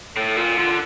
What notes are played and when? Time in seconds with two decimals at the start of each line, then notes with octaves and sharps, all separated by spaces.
0.17 A2 A4
0.36 A#2 F4
0.57 D3 F4